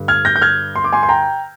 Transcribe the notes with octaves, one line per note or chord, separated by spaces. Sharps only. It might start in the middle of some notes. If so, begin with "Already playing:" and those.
Already playing: G2 D3
F6 G#6
G6 A#6
G6
F6 G#6
C6
D6
G#5 C6
C6
G5 A#5